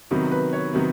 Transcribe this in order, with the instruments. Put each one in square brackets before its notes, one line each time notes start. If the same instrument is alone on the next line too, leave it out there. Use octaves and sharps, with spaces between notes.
[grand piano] C3 D#3 F#3 B3
B4
C#5
C3 D#3 F#3 B3